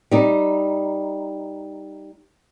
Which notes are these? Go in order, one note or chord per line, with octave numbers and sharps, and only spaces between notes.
G3 D#4